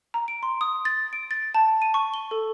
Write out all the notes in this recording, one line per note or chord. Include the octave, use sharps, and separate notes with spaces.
A#5
D7
C6
D#6
A6
D7
A6
A5
D#7
C#6
G7
A4